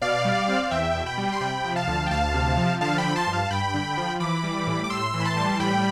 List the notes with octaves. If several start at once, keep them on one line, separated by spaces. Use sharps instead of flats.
B2 D5 F5
G3
C4
F5
E2 E5 G5
B2
G5 B5
G3
C6
C3 G5 B5
F3
F5 A5
D2
G5
D2 F5 A5
C3
F3
D3 F5 A5
G5 B5
F3
A5 C6
G2
F5 A5
G2 G5 B5
D3
F3
E3 B5 D6
G3
A2
D6
A2 C6 E6
E3
B5
A5 C6
G3
A2 G5 B5